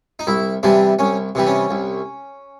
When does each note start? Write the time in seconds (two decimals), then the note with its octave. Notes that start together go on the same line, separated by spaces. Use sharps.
0.19 D#4
0.27 C2 E4
0.63 C3 E3 G3 D4
0.99 C2 C#4
1.35 C3 E3 G3
1.47 C#4
1.71 C2